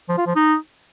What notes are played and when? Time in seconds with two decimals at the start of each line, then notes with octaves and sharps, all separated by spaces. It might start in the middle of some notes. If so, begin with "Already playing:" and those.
0.09 F3
0.18 F4
0.27 F3
0.36 D#4